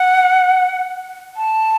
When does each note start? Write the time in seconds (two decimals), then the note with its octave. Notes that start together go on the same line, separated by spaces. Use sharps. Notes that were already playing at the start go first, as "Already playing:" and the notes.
Already playing: F#5
1.37 A5